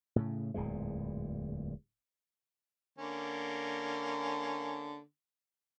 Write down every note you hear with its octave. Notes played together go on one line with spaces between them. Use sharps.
A2 C#3
D1 E2 A#2 G#3
D3 A#3 C#4